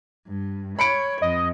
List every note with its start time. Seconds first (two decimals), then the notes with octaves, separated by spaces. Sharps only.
0.27 G2
0.79 C#5 B5 C#7 D7
1.22 F2 D#5